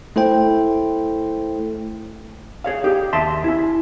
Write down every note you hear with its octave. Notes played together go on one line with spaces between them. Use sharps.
A3 E4 A4 C5 G5
G#4 C#5 F5
D#4 G4
D#2 E5 A5 C6
C#4 E4